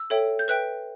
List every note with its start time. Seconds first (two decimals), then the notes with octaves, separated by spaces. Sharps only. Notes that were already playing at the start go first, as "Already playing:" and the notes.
Already playing: E6
0.10 A4 C#5 E5 G5
0.39 G6
0.48 B4 E5 G5 F#6